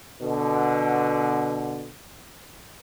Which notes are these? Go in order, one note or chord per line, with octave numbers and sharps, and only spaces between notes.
B2 D3